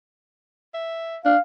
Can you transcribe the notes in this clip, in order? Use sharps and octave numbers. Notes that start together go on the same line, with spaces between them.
E5
D4 F5